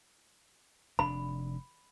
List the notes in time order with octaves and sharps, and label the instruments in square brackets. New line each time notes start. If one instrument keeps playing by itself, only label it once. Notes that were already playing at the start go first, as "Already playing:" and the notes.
[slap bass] F1 D4 [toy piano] B5